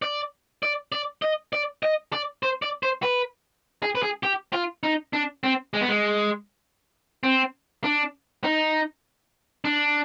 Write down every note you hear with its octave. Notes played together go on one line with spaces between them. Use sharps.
D5
D5
D5
D#5
D5
D#5
D5
C5
D5
C5
B4
G#4
B4
G#4
G4
F4
D#4
D4
C4
G#3
B3
G#3
C4
D4
D#4
D4